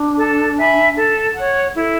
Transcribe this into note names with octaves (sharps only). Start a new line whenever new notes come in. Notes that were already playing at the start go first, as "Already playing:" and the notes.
Already playing: D4
A4
E5 G#5 B5
A4
C#5 F#5
E4 A4